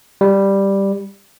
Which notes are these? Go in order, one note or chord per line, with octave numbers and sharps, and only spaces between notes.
G3